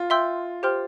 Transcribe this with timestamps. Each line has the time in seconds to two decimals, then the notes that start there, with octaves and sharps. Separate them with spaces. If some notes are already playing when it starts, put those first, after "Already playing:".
Already playing: F4
0.10 E5 G5 C6 E6 G6
0.63 G4 C5 G5 C6 F6